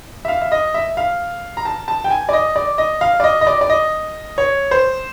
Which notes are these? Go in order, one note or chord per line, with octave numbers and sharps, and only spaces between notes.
E5
F5
E5
D#5
E5
F5
A#5
A5
A5
G5
G#5
D5
D#5
D5
D#5
F5
D5
D#5
D#5
D5
D5
D#5
C#5
C5